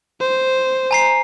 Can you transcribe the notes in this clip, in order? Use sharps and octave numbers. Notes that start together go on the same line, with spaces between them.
C5
G#5 A#5 C7